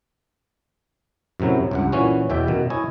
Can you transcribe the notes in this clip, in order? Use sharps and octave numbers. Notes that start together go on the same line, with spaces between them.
F#2 A2 C3 F#3 E4
C#2 G2 F#5
A#2 E3 C#4 F#4
E2 B2 E5 G5
F#2 B2 D#3
E4 C#5 D#5 G#5